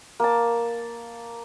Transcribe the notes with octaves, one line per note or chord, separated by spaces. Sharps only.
A#3 A5